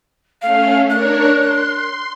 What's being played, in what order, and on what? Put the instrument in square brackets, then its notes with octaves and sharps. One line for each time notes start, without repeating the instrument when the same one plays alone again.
[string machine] A3 C#4 [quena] F5
[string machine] D4 A#4 C#5 [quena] F#6
[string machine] C6